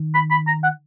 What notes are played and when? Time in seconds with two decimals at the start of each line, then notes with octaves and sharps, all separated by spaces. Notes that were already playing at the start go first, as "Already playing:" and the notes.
Already playing: D#3
0.14 B5
0.31 B5
0.47 A#5
0.64 F#5